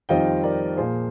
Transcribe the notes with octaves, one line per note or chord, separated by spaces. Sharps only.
F2 D#3 G3 C4 F4 D#5 G5
A#4 D5
A#2 F3 A#3 G#4 C5